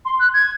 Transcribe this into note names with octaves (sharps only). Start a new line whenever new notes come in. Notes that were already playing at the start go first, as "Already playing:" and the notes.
C6
F#6
G#6